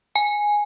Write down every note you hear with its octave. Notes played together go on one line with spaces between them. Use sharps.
G#5